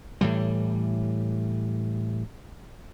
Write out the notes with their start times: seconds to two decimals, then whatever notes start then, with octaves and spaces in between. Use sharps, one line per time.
0.21 A2 E3 G3